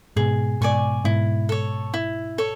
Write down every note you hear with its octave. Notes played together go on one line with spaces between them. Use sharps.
G#2 B2 G#4
G#2 B2 D5 G#5 C#6
G#2 B2 E4
A4 C#5
E4
A4 C#5